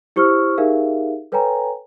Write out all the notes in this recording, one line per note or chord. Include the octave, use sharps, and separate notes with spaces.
E4 G4 C5 C#6 E6 F6
D#4 G4 G#4 A#4 E5 F5
A4 B4 C#5 G5 G#5 A#5